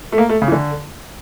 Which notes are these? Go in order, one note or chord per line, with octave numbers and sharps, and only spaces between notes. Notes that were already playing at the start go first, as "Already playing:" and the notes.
A3
A#3
A3
C#3
E3
D3